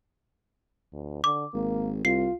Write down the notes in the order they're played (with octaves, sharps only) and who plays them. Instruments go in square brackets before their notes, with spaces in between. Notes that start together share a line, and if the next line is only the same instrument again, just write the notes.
[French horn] D2
[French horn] D3 [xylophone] D6
[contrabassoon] G#1 [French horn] A#3
[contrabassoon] C2 [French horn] F4 [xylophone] C7